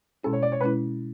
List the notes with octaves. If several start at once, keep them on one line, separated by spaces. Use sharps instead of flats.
B2 G#3 C#4 E4 A4
C#5
D5
C#5
B2 G#3 C#4 E4 B4